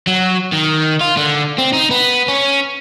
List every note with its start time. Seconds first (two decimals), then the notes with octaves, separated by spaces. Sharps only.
0.07 F#3
0.52 D#3
1.01 F4
1.17 D3
1.58 C4
1.73 D#4
1.91 B3
2.28 C#4